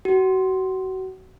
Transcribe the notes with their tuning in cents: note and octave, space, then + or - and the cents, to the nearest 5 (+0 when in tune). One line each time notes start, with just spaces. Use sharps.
F#4 +30